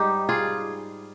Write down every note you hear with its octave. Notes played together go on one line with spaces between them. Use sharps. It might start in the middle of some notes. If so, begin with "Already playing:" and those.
Already playing: G#2 G3 D#4 G4
F4 G#4